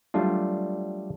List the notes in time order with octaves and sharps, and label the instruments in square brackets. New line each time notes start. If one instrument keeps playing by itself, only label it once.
[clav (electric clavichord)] F#3 G3 A3 D4 F4